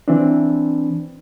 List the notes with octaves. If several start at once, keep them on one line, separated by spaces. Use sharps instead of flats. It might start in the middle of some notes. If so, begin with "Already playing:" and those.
E3 C4 D4